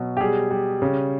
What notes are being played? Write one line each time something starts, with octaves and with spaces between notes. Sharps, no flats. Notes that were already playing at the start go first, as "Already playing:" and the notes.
Already playing: B2 F#3
G4
G3 G#4
G3
C#3